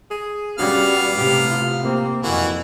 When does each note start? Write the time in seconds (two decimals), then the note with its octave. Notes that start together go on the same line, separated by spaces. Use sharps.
0.11 G#4
0.59 G3 B3 C#4 F#4 F5 F6
1.16 A2 C3 G4
1.50 F4
1.82 C3 A#3 C4
2.23 F2 E3 A#3 F#4